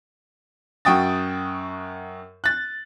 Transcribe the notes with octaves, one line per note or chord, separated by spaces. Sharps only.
F#2 F#4 G5 D#6 A6
F#6 A6